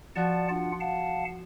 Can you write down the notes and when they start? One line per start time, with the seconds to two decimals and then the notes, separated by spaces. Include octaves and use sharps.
0.16 F3 F#4 D5 F#5 A5
0.49 D4 F4 F#5
0.80 F5 F#5 A5